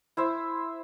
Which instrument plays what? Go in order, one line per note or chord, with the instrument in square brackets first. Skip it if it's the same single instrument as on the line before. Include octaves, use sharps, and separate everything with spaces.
[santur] E4 C5 E5